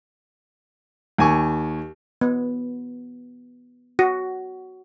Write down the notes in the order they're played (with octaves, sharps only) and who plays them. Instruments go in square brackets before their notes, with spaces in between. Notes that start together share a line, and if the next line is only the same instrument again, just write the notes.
[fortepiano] D#2 G#5 C#6
[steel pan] B3
F#4